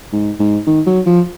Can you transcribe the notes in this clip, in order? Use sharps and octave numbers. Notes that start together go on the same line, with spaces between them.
G#2
G#2
D#3
F#3
F3